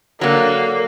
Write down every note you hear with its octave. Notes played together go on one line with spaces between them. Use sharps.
D3 F#3 A#3